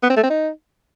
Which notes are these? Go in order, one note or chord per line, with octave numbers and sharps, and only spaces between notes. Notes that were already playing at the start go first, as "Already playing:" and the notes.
B3
C4
A3
C4
D#4